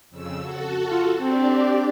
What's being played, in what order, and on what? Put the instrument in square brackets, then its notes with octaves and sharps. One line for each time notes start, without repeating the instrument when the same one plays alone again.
[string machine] F2 C#3 E6
F#4 A4
[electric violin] F4
[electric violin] C4 [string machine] D4 G4 D5